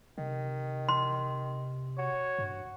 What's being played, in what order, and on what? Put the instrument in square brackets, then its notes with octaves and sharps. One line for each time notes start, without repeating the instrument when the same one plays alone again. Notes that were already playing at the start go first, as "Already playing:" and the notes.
[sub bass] C3 [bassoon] D#3
[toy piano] C6
[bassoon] F#4 [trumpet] C#5
[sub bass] G2